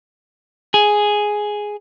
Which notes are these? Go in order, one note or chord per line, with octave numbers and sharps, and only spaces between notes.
G#4